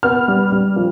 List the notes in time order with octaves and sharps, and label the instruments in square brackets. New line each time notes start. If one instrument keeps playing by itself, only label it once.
[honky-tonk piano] B3 F6
G3
G3
F3